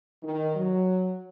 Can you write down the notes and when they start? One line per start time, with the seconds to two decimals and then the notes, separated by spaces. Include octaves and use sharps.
0.23 D#3
0.55 F#3